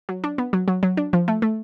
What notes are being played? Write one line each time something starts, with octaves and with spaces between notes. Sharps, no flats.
F#3
D4
B3
F#3
F#3
F#3
D4
F3
A3
A3